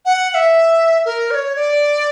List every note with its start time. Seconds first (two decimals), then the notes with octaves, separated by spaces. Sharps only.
0.05 F#5
0.30 F#5
0.34 E5
1.05 A#4
1.31 D5
1.35 C#5
1.56 D5